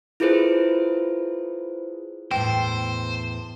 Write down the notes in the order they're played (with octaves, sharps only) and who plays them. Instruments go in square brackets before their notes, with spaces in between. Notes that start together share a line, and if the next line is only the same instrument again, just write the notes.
[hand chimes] E4 F4 G#4 A4 B4 C5
[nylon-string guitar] E2 A2 [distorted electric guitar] C5 [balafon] G5